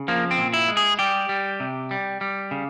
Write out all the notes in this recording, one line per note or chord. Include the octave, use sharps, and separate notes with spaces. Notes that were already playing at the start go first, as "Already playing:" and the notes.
Already playing: C#3
F3 A#3
C4
A#2
E4
G#3
G#4
G3 G4
G3
C3
G3
G3
C#3